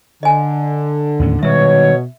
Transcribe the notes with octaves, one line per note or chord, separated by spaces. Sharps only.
D3 D#5 G#5
D#2 A2 C#4
B2 D#3 G3 G#3 C#5 E5